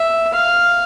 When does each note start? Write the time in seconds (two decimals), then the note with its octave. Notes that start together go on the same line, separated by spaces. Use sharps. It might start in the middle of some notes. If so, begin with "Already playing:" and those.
Already playing: E5
0.33 F5